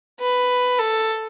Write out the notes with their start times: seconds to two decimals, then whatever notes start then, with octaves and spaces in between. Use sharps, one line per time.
0.20 B4
0.79 A4